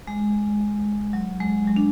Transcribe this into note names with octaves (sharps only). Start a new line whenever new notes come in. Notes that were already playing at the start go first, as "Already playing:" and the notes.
G#3
F#3
G#3
F#3
D4